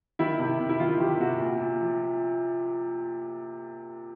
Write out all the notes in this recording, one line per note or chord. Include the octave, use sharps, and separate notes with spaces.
D#3 E4
C3
C3
E4
D#3 F4
D#3 G4
C3 F#4
A#2
A#2
F3